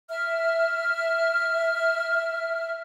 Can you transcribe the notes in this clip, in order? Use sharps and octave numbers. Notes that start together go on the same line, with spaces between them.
E5 F6